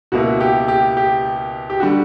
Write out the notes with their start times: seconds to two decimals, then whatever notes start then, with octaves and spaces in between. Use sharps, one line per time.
0.12 C#2 B2 A#3 E4 F#4
0.40 G4
0.68 G4
0.97 G4
1.70 G4
1.80 D3 G3 F#4